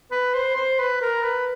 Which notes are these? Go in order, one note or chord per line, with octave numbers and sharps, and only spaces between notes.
B4
C5
C5
B4
A#4
B4